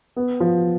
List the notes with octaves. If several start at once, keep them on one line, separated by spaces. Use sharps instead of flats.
B3
F3